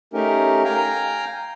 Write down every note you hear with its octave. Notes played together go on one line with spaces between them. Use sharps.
A3 C#4 D#4 G4 A#4
F5 G5 G#5 A#5